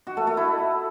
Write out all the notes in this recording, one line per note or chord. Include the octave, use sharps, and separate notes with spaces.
F#4
A3
A3
E4